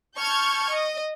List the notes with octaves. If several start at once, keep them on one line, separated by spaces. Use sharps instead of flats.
A5 C#6 F6 G6 G#6
D#5